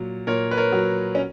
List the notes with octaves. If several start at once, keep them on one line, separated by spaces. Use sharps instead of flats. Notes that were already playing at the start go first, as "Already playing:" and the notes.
Already playing: A#2 F#3
A#2 A#4 C#5
B4
A#4 C#5
F#3
C#4